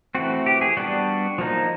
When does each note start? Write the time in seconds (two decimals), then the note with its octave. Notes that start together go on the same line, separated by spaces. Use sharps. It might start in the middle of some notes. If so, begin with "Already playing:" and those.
0.15 E3 A3 C4 F#4
0.46 G4
0.61 G#4
0.77 G3 B3 D4 F#4
1.38 F3 A#3 D#4